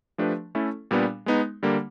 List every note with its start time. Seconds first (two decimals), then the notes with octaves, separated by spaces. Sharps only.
0.18 F3 A3 D4 G4 B4
0.55 A3 C#4 E4 A4
0.91 A#2 G3 B3 D4
1.26 G#3 B3 D#4
1.63 D3 G3 A#3